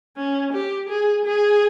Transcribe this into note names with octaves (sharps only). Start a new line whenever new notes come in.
C#4
G4
G#4
G#4